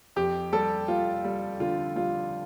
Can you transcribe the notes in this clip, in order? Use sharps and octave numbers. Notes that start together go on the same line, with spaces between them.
F2 G4
G3 A4
G3 F4
G3
D3 F4
G3 F4